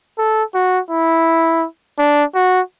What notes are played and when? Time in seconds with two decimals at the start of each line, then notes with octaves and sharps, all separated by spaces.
0.18 A4
0.54 F#4
0.90 E4
1.99 D4
2.35 F#4